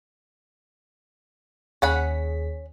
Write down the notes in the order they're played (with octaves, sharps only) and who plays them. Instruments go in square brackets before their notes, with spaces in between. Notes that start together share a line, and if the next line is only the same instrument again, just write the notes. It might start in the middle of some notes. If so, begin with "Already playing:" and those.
[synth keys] D#2 G#4 B6 [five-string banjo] C#4 F#5 B5